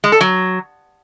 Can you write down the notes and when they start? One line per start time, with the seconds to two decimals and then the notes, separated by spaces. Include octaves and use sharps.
0.04 G#3
0.12 A4
0.21 F#3